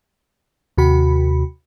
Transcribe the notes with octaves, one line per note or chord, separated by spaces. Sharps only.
D#2 C3 F#4 B5